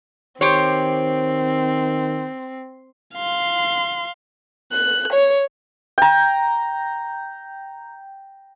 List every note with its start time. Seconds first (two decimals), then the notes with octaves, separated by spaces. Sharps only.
0.41 D#3 C4 G4 C5 C#5
3.16 F5 C6
4.71 F#6
5.12 C#5
5.98 G5 A#5